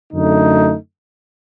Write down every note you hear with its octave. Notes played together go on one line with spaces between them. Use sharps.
F#2 D3 A3 D#4